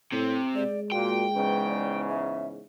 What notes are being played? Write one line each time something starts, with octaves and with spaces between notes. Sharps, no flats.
A2 C3
G#3 D5
A#2 F#4 G5
E2 G#2 C#3 B4
D5
E5